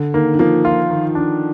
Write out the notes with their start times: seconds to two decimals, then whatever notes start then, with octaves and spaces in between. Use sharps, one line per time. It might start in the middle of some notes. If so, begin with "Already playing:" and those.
Already playing: D3
0.14 D#3 A#3
0.34 D#3
0.39 F3 A#3
0.65 F4
0.90 D#3
1.15 D4